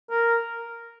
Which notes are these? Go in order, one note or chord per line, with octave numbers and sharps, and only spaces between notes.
A#4